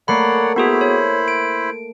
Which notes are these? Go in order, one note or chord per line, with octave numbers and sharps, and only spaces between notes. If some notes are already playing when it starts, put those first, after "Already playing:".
A3 A#3 C#5 D5 F#5 B5 C7
B3 E4 F#4 G#4 C5 B5
C#5
D7